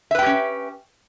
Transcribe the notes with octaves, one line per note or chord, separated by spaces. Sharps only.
C#4 G4 B4 E5 G5